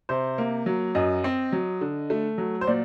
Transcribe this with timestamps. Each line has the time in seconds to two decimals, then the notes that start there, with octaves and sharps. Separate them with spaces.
0.09 C3 C5
0.38 A#3
0.66 F#3
0.95 F#2 D#5
1.24 C4
1.52 F#3
1.81 D3
2.10 A3
2.38 F#3
2.61 C5
2.67 A#2 D5